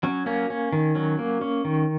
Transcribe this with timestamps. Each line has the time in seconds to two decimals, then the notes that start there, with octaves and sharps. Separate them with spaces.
0.03 F#3 C#4
0.26 A#3 C#4
0.50 C#4
0.73 D#3
0.95 F#3 C#4
1.19 A#3
1.41 C#4
1.65 D#3